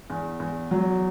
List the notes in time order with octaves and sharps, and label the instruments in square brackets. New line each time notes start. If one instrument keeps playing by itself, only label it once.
[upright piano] E2
E2
F#3